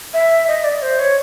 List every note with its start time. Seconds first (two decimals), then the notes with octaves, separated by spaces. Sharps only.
0.14 E5
0.48 D#5
0.64 D5
0.82 C5
0.99 C#5